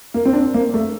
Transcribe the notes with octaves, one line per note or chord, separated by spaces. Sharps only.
A#3
C4
D4
A#3
A3